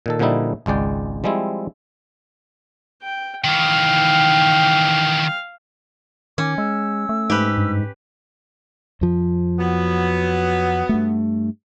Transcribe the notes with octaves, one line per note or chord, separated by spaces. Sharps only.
A#2 D#3 A4
A#2 D3 F3 G3 D#4 E4
G#1 C#2 G#3 D5 G5
F3 G3 G#3 C4 E4
G5
D#3 E3 F5 G5
D#3 C#4 D6
G#3 E6
A3
G#2 G4 B4
G2
F2 F3
F#3 B3
G2 A3